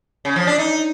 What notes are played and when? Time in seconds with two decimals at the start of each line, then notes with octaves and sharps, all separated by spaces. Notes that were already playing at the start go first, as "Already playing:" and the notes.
0.25 C#3
0.36 F3
0.47 D4
0.58 D#4